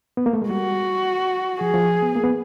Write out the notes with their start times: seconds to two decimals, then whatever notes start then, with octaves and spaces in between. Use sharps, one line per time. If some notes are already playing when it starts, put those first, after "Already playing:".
0.17 B3
0.26 A#3
0.33 A3
0.42 G#3
0.49 G3 F#4
1.60 F3 G#4
1.74 F3
2.02 B3
2.15 A#3
2.24 B3